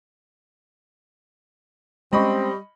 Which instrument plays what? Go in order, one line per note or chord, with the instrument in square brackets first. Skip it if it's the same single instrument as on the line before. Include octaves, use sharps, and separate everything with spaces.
[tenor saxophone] G3 [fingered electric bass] G#3 C#4 [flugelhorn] C4 [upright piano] D#5 B5 C#6